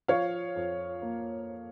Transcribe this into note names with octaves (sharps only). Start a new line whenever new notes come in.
F3 C#5 F5
F2
A#3